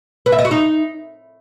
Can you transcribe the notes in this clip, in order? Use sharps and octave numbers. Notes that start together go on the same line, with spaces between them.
B4
E5
D#5
F#4
D#4